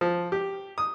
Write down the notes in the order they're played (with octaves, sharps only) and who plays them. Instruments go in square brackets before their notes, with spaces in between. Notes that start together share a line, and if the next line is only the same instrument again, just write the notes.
[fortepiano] F3
G4
D#6